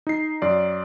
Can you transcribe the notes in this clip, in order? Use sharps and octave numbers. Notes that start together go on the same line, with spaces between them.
D#4 C7
F#2 D5